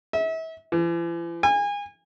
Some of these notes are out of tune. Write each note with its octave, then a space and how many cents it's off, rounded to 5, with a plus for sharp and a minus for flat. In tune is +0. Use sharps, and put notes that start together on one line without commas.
E5 -35
E3 +45
G#5 -30